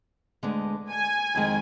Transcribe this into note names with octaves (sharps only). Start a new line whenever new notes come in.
D2 D3 G#3 B3 D4
G#5
F2 D#3 G#3